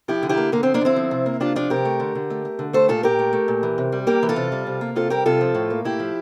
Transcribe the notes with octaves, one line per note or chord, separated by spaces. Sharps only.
F3 E4 G4
D3
E4 G4
A#3
D3 A#3
F3 C4
A#3 D4
D3 C4 E4
F3
C3
A#3
C3 D4 F4
F3 D4 F4
C3 G4 A#4
A3
D3
D3
A3
A3
D3
A3 A4 C5
A#2 F4 A4
A#2 G4 A#4
A3
A3
A#2
E3
C3
G3
A#3 G4 A#4
E3
F4 A4
C3
G3
C3
A#3
C3 F4 A4
G3 G4 A#4
C3 F4 A4
F3
A2
A#3
A2 E4 G4
F3